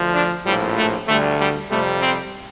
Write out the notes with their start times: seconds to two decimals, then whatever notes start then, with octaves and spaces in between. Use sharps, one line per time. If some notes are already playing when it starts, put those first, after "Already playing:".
Already playing: D2 D3 F3
0.14 D4
0.45 A#1 A2 F3 G3
0.77 A3
1.07 D2 D3 G3 A3
1.39 G3
1.70 F2 C3 G3 A3
2.01 C4